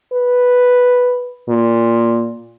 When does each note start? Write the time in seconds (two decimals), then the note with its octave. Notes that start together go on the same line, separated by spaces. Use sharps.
0.13 B4
1.49 A#2